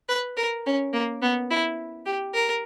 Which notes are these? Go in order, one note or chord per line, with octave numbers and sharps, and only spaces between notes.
B4
A#4
C#4
A#3
B3
E4
G4
A#4